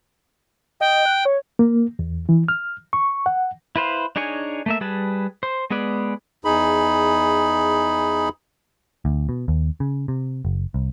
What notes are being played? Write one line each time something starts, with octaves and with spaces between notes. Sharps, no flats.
D#5 G5
F#6
C#5
A#3
E2
E3
F6
C#6
F#5
E4 B4 C5 F5
D4 D#4 G#4 C#5 G#5
A3 A#3 E5
G3 G#4 B4 A5
C5
G#3 B3 G#4 B4 D5
E2 D#4 G#4 B5
D2
B2
D#2
C#3
C3
F#1
C2